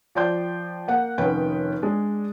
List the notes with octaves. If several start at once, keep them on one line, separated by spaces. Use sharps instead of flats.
F3 D5 G5 C6 G6
A#3 F#5
F1 D#3 C#4 B4 G5
G#3 D4